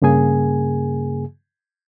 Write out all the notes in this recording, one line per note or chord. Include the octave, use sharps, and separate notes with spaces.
G2 C#3 A#3 G#4 G#5